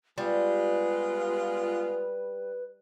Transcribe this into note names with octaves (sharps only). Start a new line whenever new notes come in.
G3 G#3 B3 F4 B4